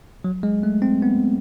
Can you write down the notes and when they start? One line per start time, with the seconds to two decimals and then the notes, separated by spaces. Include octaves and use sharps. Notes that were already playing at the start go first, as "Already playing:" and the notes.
0.24 F#3
0.43 G#3
0.63 A3
0.82 C4
1.02 B3